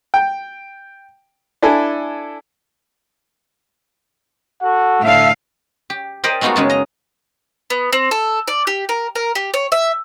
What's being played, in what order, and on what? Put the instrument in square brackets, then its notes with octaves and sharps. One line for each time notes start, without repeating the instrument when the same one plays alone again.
[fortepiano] G5
D4 E4 A4 G#5
[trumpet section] F#4 A4 F#5
[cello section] A2 D3 F5 [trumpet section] A4 E5
[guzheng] G4
G4 A#4 C5 D5 D#5
G#3 A3 B3 D#4 F4 F#4
F#2 C#3 G#3 A5
D#5 A#5
[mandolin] B3
C4
A4
D5
G4
A#4
A#4
G4
C#5
E5